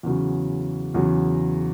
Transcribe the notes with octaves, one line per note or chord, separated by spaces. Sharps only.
E2 C#3 F#3
E2 C#3 F#3